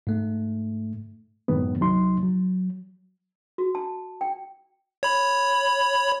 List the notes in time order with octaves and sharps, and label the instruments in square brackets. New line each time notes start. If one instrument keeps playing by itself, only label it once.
[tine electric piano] G#2 A3
[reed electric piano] F#2 A2 D#3 G#3 B3
C2 F#3 D#4 C6
F#3
[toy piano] F#4
A5
G5
[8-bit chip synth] C#5 B5